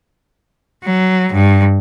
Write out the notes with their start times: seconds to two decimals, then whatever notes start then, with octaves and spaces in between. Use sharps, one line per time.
0.83 F#3
1.32 G2